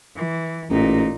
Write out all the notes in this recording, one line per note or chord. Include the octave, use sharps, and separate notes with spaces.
E3
A1 A#2 D#4